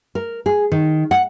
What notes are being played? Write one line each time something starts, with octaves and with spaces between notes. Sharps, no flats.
A#4
G#4
D#3
F#5